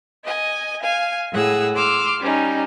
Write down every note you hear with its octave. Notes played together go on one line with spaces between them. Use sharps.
D#5 G#5
F5 G#5
A2 G#4 F#5 E6
C6 D6 E6 F6
G3 C#4 D#4